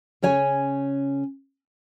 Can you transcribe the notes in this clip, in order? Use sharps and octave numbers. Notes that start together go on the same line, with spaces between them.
C#3 C#4 C#5 G#5